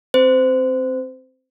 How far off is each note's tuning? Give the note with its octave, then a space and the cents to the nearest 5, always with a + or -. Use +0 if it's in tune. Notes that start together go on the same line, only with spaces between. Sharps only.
C4 +5 C5 -25